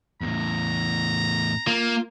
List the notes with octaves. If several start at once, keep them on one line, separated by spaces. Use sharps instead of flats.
E2 A2 A#5
A#3 F4